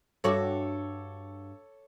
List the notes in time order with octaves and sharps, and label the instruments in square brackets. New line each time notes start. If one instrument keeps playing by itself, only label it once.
[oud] G2 F#4 E5 [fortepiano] A4 C#5 D6